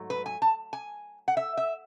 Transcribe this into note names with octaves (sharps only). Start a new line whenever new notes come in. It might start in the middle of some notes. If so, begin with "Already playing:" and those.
Already playing: G#2 F#3 A3
B4
G#5
A5
G#5
F#5
E5
E5